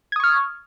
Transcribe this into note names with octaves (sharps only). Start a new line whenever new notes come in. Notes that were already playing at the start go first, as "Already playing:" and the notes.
C#6 D#6 F6 G#6